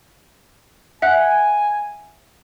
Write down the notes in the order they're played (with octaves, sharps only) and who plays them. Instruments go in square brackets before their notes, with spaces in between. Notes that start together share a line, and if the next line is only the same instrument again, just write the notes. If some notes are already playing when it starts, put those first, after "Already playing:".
[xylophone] E5 F#5 F#6 [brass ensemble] G#5